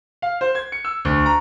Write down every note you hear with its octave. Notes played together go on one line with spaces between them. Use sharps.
F5
C5
G#6
C#7
E6
D2
A#5